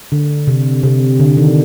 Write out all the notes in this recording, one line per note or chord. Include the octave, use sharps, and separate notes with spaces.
D3
C3
C3
D3
D#3